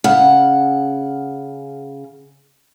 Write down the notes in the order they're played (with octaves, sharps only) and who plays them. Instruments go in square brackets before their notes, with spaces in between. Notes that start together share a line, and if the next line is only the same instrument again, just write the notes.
[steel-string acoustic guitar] C#3 F#5